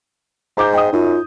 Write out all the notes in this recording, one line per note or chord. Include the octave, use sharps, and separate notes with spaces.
G#2 A#5 D6 G6
D#5 G5 D#6
F#2 D#4 F4